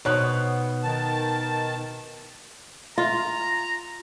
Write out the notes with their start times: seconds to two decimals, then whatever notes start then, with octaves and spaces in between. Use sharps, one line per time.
0.05 B2 B3 D#4 C5 C#5 F#6
0.83 D#3 A5
2.98 F4 A#5